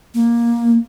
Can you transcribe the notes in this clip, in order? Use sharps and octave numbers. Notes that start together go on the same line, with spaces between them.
A#3